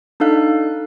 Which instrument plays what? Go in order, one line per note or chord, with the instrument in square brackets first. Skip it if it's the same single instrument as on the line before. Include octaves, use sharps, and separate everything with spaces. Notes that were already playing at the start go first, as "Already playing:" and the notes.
[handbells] D4 D#4 A4 F5 F#6